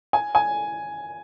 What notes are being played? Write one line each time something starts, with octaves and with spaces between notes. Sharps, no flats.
G#5
G#5